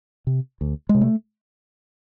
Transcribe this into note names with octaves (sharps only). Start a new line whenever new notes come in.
C3
D2
G#3
C3
A3